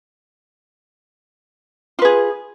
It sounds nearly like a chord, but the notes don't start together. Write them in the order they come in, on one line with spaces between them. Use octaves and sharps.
F4 B4 G#4